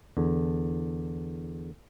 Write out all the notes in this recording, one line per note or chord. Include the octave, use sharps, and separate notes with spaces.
E2 D3